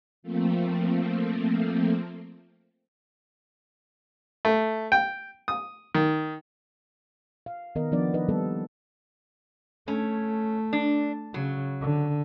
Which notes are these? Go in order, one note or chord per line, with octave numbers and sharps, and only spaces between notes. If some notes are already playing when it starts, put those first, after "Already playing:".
F3 A3 A#3 C4
A3
G5
D#6
D#3
F5
D#3 B3 A#4 D#5
F3 B3 D4 D5
D#4 B4 D#5
G3 A#3 B3 A4
A3 C#4
D4
C#3 F#3
D3